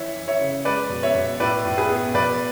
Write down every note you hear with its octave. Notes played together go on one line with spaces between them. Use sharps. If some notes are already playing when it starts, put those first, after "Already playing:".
Already playing: E3 C#5 E5
E3
C#5 E5
C#3
G#3 B4 D5
B2
C#5 E5
B2
A2 B4 D5
A2
G#4 B4
B3
B2 B4 D5